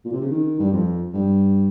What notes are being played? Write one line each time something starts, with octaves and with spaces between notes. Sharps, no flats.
A#2
C3
C#3
D#3
G2
F2
G2